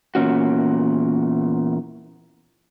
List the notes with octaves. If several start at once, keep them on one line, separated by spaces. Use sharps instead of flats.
E2 A#2 D#3 C#4 F#4